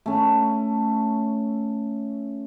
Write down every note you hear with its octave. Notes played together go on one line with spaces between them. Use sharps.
A3 C#4